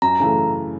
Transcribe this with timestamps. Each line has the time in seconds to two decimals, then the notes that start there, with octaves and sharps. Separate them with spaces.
0.02 F#2 A#5
0.20 C#3 E3 A3